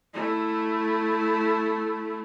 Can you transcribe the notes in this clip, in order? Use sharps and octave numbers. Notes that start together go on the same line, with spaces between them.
A3 E4